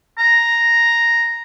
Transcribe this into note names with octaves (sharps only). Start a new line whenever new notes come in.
A#5